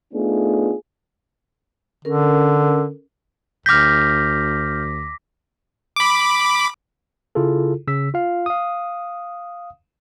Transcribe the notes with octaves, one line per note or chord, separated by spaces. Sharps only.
A3 B3 D4 D#4 F4 G#4
D3 C#4 A4 A#4
D2 D6 F6 G6 A#6 B6
B5 D6
C#3 E4 F4 G#4 A4
C#3 E6 B6
F4 F5
F5 D#6